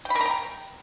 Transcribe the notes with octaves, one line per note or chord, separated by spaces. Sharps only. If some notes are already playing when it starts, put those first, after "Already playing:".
G5
B5
A#4
A#5
G5